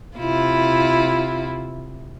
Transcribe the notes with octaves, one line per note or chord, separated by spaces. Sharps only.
C3 E4 F4